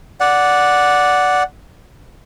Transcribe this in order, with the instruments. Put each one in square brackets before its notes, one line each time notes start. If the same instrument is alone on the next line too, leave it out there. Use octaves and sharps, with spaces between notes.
[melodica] D5 F#5